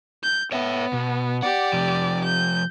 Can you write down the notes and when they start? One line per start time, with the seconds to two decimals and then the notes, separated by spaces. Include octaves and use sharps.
0.23 G6
0.52 B3 C#5 E5
0.93 B2
1.42 G4 D5 F#5
1.73 C3 F3
2.24 G6